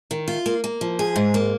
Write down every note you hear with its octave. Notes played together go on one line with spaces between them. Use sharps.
D#3
F4
A#3
A#3
F3
G#4
G#2
A#3